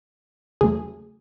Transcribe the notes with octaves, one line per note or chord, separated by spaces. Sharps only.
E2 C#3 F#3 A3 G#4